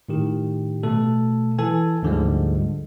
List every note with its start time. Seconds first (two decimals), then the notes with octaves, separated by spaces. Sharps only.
0.09 A2 D#3 G4
0.83 B2 A3 A4
1.59 E3 A4 G#5
2.03 D2 G#2 D3 F3 G3 G#3